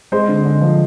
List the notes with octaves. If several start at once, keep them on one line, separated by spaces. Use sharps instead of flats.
G#3 C5
D3
D3
F3